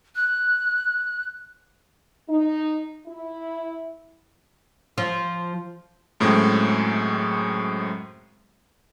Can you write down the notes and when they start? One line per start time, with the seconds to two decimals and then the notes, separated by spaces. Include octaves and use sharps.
0.15 F#6
2.29 D#4
3.07 E4
4.98 F3
6.20 F#2 A2 F#3 G#3 C4